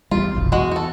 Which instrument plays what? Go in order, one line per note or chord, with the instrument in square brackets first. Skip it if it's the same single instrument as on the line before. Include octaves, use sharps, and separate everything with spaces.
[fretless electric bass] E2 G3 [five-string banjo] F4
[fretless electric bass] F1 B1 F#2
[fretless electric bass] E2 [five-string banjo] G#3 F#4
[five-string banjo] F#4 A4